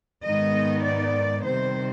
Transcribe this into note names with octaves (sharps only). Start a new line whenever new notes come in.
G#2 D#3 G#3 B3 D#4 D#5
D5
C3 D#3 G3 C5